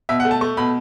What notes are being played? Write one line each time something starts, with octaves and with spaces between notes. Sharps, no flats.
B2 E5
F#5
A3
A5
A3 C#6
B2 B5